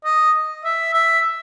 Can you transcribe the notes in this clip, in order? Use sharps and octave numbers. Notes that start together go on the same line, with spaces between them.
D#5
E5
E5